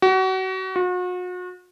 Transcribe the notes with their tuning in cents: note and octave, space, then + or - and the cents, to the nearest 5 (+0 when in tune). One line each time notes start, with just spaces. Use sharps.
F#4 +30
F#4 -40